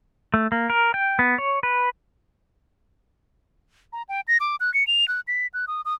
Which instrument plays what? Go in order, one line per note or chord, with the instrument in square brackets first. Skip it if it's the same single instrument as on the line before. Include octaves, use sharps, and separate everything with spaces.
[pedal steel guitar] A3
A#3
A#4
G5
B3
C#5
B4
[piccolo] A#5
G5
A#6
D6
F#6
C#7
F7
F#6
B6
F#6
D#6
D#6